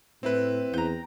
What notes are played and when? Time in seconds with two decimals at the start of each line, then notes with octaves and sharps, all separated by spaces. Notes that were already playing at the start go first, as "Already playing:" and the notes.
0.23 A2 C4 E4 B4
0.74 E2 G5 A#5